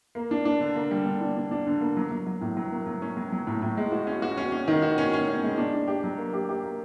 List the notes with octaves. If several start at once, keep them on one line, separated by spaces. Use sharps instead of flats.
A#3
D4
D4
D3
A#3
G3
D3
D4
D4
D4
D3
A#3
F#3
F#3
F#3
A2
F#3
A#3
F#3
C#4
F#3
F#3
A2
A2
G#3
F#4
C#4
F#4
C#4
C#4
D#3
F#4
C#4
C#4
C#4
G#3
D4
D4
G4
F#3
A#3
G4
G4
A#3